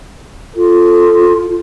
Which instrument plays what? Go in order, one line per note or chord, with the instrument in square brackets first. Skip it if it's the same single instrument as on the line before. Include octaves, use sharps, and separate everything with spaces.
[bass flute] F4 [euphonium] A4